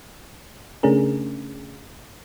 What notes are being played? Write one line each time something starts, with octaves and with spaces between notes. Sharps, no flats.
C#3 A3 C#4 D4 G#4 A#4